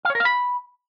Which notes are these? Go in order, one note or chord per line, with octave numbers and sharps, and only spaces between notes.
F5
C#5
A#4
F5
B5